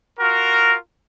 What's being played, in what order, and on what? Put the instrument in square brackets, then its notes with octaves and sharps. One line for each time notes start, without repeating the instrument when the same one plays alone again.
[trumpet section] F4 F#4 A#4